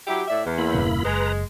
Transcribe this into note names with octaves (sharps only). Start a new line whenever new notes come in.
F#3 E4 G4
A2 D5 E5
E2
A#3 E4 B5
E1 G2 C#3
F#1 G#3 B4 A#5